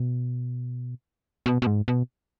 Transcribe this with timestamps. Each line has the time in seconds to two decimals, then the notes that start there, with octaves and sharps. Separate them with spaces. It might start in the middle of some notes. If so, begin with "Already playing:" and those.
Already playing: B2
1.46 B2
1.62 B2
1.67 G#2
1.88 B2